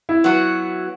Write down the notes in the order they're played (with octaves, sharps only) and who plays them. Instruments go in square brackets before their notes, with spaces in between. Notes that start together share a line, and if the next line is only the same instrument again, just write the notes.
[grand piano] E4
[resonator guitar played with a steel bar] F#3 B3 F#4